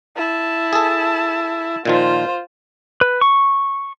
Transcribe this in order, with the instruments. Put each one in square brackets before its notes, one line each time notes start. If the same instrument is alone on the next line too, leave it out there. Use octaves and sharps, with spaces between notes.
[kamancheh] E4 A5
[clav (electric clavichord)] G#4 A4
[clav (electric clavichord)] A#2 D#3 F3 [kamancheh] F4 C5
[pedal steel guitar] B4
C#6